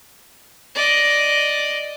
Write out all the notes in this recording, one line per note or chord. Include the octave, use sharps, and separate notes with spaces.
D5 D#5